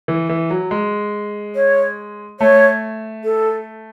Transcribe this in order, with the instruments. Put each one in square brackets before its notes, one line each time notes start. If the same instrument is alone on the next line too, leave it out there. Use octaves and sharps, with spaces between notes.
[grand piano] E3
E3
F#3
G#3
[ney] C#5
[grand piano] A3 [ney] C#5
[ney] A4